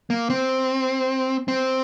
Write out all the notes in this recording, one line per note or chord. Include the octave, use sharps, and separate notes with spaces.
A#3
C4
C4